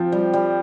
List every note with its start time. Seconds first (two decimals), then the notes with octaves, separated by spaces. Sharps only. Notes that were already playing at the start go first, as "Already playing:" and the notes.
Already playing: F3 C4
0.12 G3
0.33 G3